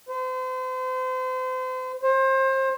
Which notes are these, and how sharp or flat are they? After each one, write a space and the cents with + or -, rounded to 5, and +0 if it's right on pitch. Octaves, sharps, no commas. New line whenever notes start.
C5 -35
C5 +30